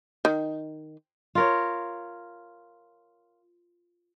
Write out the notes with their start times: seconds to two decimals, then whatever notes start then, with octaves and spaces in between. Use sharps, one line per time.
0.25 D#3
1.35 F4 A#4 C#5